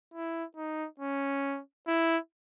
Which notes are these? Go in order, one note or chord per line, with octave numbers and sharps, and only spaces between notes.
E4
D#4
C#4
E4